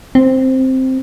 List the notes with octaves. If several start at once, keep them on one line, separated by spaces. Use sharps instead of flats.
C4